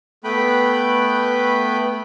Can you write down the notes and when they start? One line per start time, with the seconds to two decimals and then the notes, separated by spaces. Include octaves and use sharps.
0.24 A3 B3 B4 G5 B5